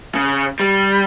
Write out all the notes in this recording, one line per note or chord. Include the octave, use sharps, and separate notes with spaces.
C#3
G3